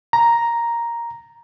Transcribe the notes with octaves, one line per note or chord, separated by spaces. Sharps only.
A#5